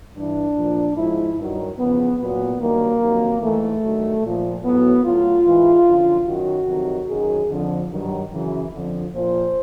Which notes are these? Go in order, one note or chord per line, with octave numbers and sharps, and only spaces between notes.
G2 E3 D4
A#2 F3
G#2 F3 E4
G2 D#3 F#3
E2 C#3 F3 B3
A#2 F#3 B3
G2 D#3 F#3 A#3
F2 C3 D#3 F#3
G#2 E3 A3
G2 D#3 F#3
A#2 F3
A2 F#3 B3
A2 F#3 F4
G#2 E3
F#2 D3 F3
F#2 D#3 F#3 F#4
F2 C3 D#3 F#3
F#2 D#3 F#3 G#4
F2 D3 F3
G2 D#3 F#3
F#2 C#3 E3
F2 D3 F3
A#2 F3 C5